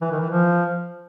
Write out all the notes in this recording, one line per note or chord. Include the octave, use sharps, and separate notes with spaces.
E3
D#3
E3
F3